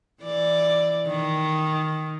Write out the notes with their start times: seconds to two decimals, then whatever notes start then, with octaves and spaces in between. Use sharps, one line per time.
0.23 E3 D5
1.07 D#3